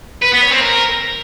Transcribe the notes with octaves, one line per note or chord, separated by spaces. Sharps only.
B4
B3
C#5
C4
A#4